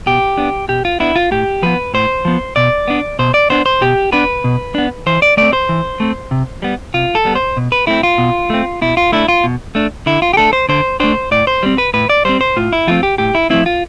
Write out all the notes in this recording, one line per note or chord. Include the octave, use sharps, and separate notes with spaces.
B2 G4
B3 D4
B2 G4
F4
B3 D4 E4
F4
A2 G4
F3 B3 B4
A2 C5
F3 B3
B2 D5
B3 D4
B2 C5
D5
B3 D4 C5
C5
B2 G4
B3 D4 B4
B2
B3 D4
E3 C5
D5
A3 C4 D5
C5
E3
A3 C4
C3
G3 B3
C3 F4
A4
G3 B3
C5
B2
B4
A3 C4 E4
F4
B2
A3 C4
B2 E4
F4
A3 D4 E4
F4
B2
A3 D4
D3 E4
F4
G4
A3 D4 A4
C5
D3 C5
A3 D4 C5
A2 D5
C5
G3 C4
B4
A2 B4
D5
G3 C4 C5
C5
A2 F4
E4
F3 A3 C4 F4
G4
A2 G4
E4
F3 A3 C4 E4
F4